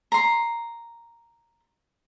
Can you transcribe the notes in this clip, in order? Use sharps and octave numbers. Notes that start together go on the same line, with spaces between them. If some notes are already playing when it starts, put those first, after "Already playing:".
A#5 C6